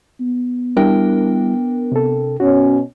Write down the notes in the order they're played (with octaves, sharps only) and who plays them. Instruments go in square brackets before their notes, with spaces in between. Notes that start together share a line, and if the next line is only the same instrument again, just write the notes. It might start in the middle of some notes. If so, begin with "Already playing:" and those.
[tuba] B3
[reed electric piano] G3 E4 [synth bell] D4 A#4 G5
[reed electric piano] C3 A4
[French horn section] B2 C#4 [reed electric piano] F#4